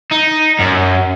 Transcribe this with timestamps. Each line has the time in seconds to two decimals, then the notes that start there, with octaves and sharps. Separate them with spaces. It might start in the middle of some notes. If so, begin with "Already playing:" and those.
0.12 D#4
0.60 F#2